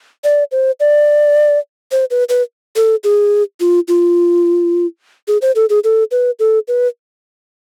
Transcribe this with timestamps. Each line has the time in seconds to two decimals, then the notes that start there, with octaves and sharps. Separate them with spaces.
0.24 D5
0.52 C5
0.80 D5
1.92 C5
2.11 B4
2.29 B4
2.76 A4
3.04 G#4
3.60 F4
3.88 F4
5.28 G#4
5.42 C5
5.56 A4
5.70 G#4
5.84 A4
6.11 B4
6.39 A4
6.68 B4